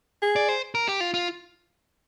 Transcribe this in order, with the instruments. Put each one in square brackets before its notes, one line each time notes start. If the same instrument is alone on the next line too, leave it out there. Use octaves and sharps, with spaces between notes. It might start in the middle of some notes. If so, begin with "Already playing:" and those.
[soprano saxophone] G#4
[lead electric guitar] D5
C5
A#4
G4
F4
F4